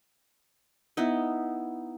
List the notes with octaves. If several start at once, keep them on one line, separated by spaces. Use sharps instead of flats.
B3 D#4 E4